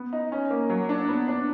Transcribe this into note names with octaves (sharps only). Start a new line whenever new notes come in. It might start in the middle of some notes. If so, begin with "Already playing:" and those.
Already playing: B3
D#4
C#4
A#3
F#3
D4
B3
D4